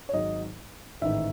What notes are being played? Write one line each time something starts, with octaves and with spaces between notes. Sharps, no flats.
C#5
G#1 G#2 F#3 D#5
A1 G#2 D#3 E5